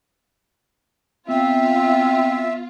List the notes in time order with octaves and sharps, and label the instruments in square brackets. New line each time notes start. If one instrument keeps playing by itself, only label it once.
[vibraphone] B3 [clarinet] C4 [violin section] F4 [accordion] E5